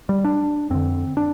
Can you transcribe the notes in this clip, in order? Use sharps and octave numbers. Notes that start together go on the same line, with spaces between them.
G3
D4
F2 D3 C4
D4